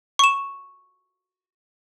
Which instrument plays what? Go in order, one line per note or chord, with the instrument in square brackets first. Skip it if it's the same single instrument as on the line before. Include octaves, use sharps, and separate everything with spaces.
[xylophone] C#6 E7